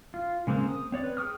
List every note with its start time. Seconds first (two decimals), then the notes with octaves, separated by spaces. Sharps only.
0.14 F4
0.47 C#3 G#3 A#3 C4
0.69 D#6
0.92 C4 C#5 D5
1.04 B4
1.17 G#4 G5 C#6 D#6 F6